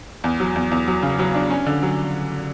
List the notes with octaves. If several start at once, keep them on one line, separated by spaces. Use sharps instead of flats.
E2
F#3
E2
E2
F#3
C#3
F#3
D4
C#4
D3
F#3